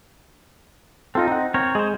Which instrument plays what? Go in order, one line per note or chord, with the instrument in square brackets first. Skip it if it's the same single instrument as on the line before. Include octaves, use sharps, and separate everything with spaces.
[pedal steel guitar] C4 D#4 [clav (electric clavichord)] F4 A4
[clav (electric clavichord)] F#5 A#5
[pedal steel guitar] C4 A#4 C#5
[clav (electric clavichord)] G#3 [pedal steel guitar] G#4 C5